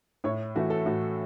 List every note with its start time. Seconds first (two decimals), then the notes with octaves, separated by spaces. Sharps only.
0.24 A2 C#5
0.56 E3 A3 F#4
0.70 A4
0.86 A2 F#4